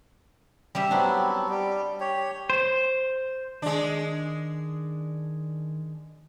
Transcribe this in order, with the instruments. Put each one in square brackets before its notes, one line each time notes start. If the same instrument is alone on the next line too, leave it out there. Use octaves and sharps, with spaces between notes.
[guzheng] G3 G4 E5
[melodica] F#3 B3 C4 [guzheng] D4 E4
[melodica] G3
G4 C#5
[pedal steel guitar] C5
[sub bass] D#3 [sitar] G#3 D4